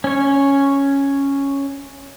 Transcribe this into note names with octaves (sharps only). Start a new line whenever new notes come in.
C#4 C#5